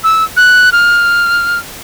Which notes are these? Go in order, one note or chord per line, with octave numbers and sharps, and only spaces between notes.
E6
F#6
F6